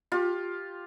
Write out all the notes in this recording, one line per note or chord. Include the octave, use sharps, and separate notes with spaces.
F4 G4